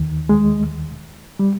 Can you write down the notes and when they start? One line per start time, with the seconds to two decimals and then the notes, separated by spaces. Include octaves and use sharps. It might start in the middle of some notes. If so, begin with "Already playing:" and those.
Already playing: D#2 D#3
0.29 G#3
1.39 G3